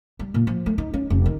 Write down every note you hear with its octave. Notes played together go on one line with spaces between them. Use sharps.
G3
A#2
F3
A3
D#4
C#4
F1
D#3